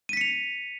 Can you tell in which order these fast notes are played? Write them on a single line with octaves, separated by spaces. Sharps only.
D#7 B6 C#7 F7